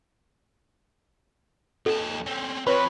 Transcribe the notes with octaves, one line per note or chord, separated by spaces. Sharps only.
D#2 A4 A5
C4 C#4
C4 F4 B4 C#5 B5